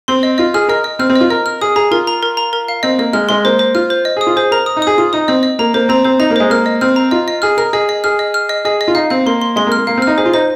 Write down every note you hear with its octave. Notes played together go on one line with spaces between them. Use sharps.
C4 C6
D#5
F4 D#5
G#4 F6
A#4 D#5
D#5
C4 F6
C4
D#5
F4
A#4 D#5
F6
G#4 D#6
G#4 A#5
F4 A#4
A#5
A#4
A#5
A#4
F5
C4 D#5
A#3 D#5
G#3 F6
G#3 C6
A#3 C5
C5
F4 F6
C5
D#5
G#4
D#6
F4
G#4 C5
A#4 A#5
D#6
D#4
G#4 D#6
F4 D#6
D#4 D#6
C4 D#5
D#5
A#3 A#5
A#3 C5
C4 A#5
C4 C5
D#4 A#5
A#3
G#3 C5
A#3 F6
D#5
C4 F6
A#5
F4 D#5
D#5
G#4 F6
A#4 F6
G#4 D#5
D#5
G#4 F6
D#5
F6
D#5
G#4 D#5
D#5
F4
D#4 F5
C4 F5
A#3 C6
C6
G#3 C6
A#3
F6
A#3
A#3 F5
C4
D#4 F6
G#4 C5
F4
D#4 C5